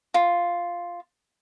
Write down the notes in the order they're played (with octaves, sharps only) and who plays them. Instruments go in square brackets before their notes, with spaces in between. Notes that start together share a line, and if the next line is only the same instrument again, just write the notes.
[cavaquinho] F4